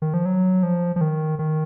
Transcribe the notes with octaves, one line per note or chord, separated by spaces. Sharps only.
D#3
F3
F#3
F3
F3
D#3
D#3